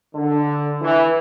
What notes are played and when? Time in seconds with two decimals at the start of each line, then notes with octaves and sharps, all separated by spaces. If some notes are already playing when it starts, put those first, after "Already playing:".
0.15 D3
0.82 E3